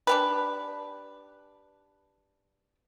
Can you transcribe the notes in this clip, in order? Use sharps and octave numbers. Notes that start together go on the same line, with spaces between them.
D4 G4 B4